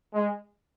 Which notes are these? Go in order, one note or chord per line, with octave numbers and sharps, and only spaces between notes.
G#3